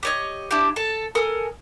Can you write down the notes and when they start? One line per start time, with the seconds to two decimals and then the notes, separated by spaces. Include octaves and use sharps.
0.03 G4 C#5 D#5
0.51 D4 E4 G4
0.76 A4 A5
1.15 A4 A#4 G#5 D#6